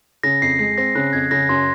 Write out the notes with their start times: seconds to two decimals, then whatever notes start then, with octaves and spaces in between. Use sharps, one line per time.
0.23 C#3 A#6
0.41 F2 C7
0.59 G#3 C7
0.78 C4 A#6
0.95 C#3 F#6
1.13 F2 G#6
1.31 C#3 A#6
1.49 F#2 C6